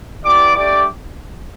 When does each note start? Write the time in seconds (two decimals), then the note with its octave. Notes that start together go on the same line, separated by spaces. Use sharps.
0.24 B3 E4 G4 D5 D6
0.55 A3 D4 G4 D5 D6